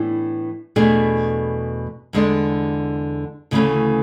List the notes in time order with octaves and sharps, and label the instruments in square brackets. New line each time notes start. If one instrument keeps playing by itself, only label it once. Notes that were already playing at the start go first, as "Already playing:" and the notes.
Already playing: [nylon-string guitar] A2 E3 B3 D4
E2 B2 A3 D4 G#4
E2 D3 G#3 D4
D2 C#3 E3 A3 C#4